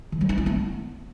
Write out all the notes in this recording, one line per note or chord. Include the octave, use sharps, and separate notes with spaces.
D#3
G3
D#4
E4
B3